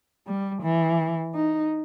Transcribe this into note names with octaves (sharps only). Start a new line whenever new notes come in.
G3
E3
D#4